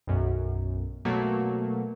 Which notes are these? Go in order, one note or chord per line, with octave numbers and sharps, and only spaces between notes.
B1 F#2
B2 F#3 A3 A#3